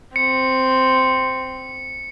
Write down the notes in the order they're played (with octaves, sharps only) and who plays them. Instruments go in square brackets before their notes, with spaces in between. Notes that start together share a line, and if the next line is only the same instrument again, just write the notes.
[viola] C4 [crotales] C#7